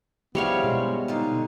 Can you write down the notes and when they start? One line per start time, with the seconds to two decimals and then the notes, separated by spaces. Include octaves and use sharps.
0.35 F3 G3 G#3 B3 D4 E4 C#5 F5
0.64 B2 G#3
1.08 G#2 D3 D#4 F4